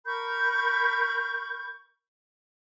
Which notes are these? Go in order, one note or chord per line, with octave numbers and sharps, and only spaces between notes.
A#4 B5 C#6 G6